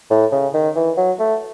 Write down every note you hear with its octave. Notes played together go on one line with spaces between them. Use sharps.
A2
C#3
D#3
E3
F#3
A3